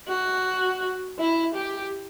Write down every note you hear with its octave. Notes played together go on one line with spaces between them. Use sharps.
F#4
E4
G4